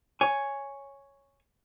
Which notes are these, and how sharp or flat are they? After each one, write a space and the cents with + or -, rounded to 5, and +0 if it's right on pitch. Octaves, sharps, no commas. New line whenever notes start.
C#5 +0 G#5 +0